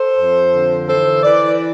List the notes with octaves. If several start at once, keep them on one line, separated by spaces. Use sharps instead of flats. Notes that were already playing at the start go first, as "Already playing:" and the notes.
Already playing: A4 C5
F2
D3
E3 A4 C5
E3 B4 D5